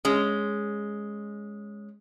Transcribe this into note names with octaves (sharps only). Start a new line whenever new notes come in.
G#3 C#4